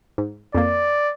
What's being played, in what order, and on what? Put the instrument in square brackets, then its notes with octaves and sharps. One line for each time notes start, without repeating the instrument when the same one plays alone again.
[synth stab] G#2
[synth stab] F2 A#3 [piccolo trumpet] D5